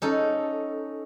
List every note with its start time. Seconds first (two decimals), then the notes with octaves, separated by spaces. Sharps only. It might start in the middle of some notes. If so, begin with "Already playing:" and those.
0.02 C#4 D#4 A4